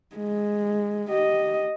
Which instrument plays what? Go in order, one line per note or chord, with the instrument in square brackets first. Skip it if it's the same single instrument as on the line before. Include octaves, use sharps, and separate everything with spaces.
[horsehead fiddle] G#3
G4 D#5